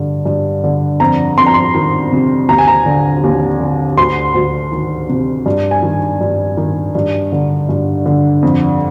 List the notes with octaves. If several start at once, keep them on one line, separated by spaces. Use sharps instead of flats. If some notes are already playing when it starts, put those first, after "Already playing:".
Already playing: G2 D3
G2
D3
F2 A#5
F2 C6
A#5
C6
D#3
C3
D#2 A#5
G#5
A#5
D3
D#2
D3
D2 C6
D2
D#3
C3
G2
G#5
D#3
G2
D#3
G2
D3
G2
D3
F2